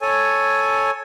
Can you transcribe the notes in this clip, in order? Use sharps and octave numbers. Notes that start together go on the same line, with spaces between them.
A4 C#5 G#5